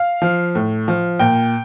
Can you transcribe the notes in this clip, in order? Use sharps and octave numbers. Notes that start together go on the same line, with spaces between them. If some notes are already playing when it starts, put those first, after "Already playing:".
Already playing: F5
F3
A2
F3
A#2 G5